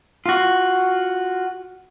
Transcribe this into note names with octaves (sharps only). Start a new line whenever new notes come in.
F4 F#4